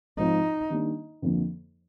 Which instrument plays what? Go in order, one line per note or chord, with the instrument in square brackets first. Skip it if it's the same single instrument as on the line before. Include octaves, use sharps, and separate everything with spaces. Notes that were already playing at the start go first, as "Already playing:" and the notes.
[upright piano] G#2 F3 C4 F4 [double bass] D#4
[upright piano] D#3 G3 A#3 D4
F2 D3 F3 A#3